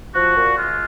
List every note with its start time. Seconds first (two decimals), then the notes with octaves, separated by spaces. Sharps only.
0.14 F3 F#4
0.35 A#2
0.56 G#3 F4